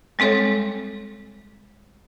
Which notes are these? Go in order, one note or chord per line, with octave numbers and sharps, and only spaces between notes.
G3 G#3 C4 A4 C#5